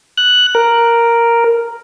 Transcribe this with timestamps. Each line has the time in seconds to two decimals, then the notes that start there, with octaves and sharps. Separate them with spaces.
0.18 F#6
0.55 A#4